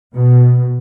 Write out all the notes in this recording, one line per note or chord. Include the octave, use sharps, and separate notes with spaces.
B2